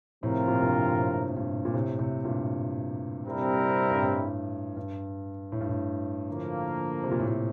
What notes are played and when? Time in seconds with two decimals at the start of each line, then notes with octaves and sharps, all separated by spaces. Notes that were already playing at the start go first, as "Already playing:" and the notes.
0.23 A2 C3 F3 C4 F4 A#4
0.48 A#2
0.55 C3
0.62 G2 A#2
0.73 G2
0.98 A2
1.37 G2 A#2
1.65 A#2
1.74 A2 C3
1.99 A2 C3
2.24 G2 A#2
3.25 C3 G3 C4 E4 A#4
3.90 G2
4.01 A2
4.76 G2
5.52 A2
5.61 G2
5.69 A2
6.28 D3 F3 A#3
7.04 C3
7.11 A#2
7.19 A2
7.28 A#2